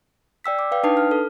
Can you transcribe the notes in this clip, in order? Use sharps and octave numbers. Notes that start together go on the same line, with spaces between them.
D5 G5 E6 B6
D6
B4 F5 G5
D4 D#4 B4 A5 D#6 C7
F6
A4